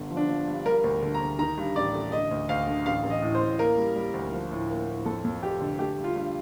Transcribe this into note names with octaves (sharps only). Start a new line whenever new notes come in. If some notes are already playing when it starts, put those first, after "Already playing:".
Already playing: G1 D3
F3
D4
F3
G2
G3 A#4
D2
D3
A#5
D2
D#3 A#5
G2
A1 D5
A3
D3 D#5
D2
D2 F5
D3
A1 F5
A1
D#5
A2
C5
A2
A#3 A#4
G3
G3
D2
F3
A2
A#3
A2
F2 A4
F2
F1 G4
D3
A3 G4
G2
F4
G2